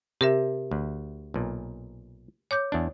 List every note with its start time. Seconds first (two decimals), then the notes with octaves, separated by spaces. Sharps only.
0.21 C3 G4 A#4 E5
0.71 D2
1.34 B1 A#2
2.51 C#5 D6 G6
2.72 E2 D4